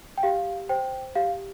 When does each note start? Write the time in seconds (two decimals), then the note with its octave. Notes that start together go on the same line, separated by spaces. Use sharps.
0.18 G5
0.23 G4 F5
0.69 C5 G5
1.15 G4 F5